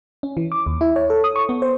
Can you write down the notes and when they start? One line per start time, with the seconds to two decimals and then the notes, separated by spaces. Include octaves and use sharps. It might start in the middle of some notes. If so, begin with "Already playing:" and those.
0.23 C#4
0.37 E3
0.52 D6
0.67 D#2
0.81 E4
0.96 C#5
1.10 A4
1.24 D#6
1.36 C#6
1.49 B3
1.62 C5